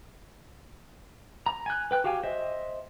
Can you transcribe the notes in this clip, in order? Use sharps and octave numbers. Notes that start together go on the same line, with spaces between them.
A#5
G#5 F#6
B4 G5 F#6
F#4 G4 F5 G5 G#5
C5 D#5 E5